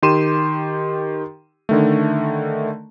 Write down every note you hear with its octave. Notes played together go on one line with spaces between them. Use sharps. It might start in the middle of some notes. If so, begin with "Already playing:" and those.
D#3 G4 C6 D#7 E7
D3 D#3 A3